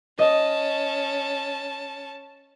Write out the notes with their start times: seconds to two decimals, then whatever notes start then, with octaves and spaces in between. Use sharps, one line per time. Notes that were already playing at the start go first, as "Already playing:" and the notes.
0.19 C#4 D#5 A5